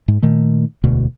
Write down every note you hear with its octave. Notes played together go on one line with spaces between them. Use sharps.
G#2
A#2 D#3 A3
E1 D2 B2